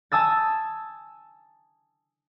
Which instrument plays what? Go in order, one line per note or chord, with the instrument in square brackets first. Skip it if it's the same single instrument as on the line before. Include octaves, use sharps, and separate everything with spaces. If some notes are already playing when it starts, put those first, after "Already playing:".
[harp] G#5 A5 D#6 E6 A6